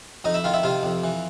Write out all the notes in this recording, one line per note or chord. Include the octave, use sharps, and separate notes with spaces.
F2 D#4 D#5
E4 E5
D#3 F4 F5
E4 E5
C3 F4 F5
F2
E3